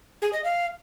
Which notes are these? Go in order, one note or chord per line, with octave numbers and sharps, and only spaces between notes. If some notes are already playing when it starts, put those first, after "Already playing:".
G#4
D#5
F5